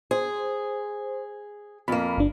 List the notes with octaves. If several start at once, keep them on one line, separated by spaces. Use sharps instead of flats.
G#4 C5
F2 A#3 B5
G1 D4